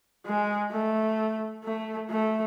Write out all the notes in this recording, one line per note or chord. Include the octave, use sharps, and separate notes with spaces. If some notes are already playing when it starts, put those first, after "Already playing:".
G#3
A3
A3
A3